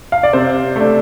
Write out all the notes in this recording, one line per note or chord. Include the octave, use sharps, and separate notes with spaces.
F5
D5
C3 C5
A3 D4